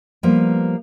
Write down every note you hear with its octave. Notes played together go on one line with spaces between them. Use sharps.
F3 G3 A#3 B3